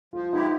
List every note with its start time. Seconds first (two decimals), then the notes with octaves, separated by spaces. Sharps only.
0.13 F3 F4
0.32 G#3 B3 D#4 E4 G4